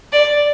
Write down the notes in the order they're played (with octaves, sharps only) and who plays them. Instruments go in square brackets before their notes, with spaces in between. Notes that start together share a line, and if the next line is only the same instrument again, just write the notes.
[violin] D5